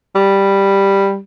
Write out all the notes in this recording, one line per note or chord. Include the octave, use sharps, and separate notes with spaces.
G3